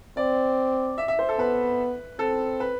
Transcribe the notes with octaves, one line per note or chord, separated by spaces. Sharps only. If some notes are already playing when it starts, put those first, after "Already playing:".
C4 D5
E5
E5
C5
A4
B3 B4
C4 A4
B4